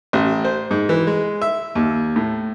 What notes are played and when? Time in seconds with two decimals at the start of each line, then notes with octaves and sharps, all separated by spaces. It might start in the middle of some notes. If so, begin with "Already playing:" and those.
0.13 A1
0.45 C5
0.71 G#2
0.89 E3
1.07 G#3
1.42 E5
1.75 D#2
2.16 A2